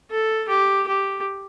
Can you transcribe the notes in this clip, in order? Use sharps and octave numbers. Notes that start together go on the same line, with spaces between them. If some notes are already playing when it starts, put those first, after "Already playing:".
A4
G4
G4